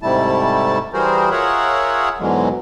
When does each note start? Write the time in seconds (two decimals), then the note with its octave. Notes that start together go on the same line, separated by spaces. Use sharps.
0.02 G#2 C3 G3 A3 E4 A5
0.93 E3 G3 F#4 G#4 A#4 C5
1.31 F4 G#4 A#4 C#5 E5 F#5
2.20 G#2 B2 D3 E3 F#3 G#3